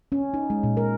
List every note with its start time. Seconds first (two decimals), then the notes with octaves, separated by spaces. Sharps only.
0.12 C#4
0.34 D#4
0.50 G#3
0.63 A#2
0.77 A#4